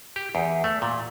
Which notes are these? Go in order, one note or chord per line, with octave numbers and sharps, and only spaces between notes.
G4
E2
A3
A#2